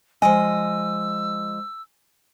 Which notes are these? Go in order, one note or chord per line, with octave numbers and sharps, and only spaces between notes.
F3 G#3 D#5 G#5 E6